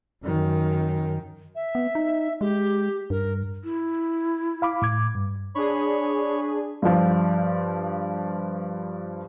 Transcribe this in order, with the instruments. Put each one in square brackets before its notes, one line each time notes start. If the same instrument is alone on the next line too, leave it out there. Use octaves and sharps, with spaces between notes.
[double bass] F#2 D#3
[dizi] E5
[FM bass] B3
D#4
[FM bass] G#3 [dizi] G4
[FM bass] G2 [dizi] A#4
[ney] E4
[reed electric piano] F5 B5 D6
A2 D6 G#6
G2
[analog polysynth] D4 G#4 [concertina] C#5 B5 C#6
[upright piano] G2 F3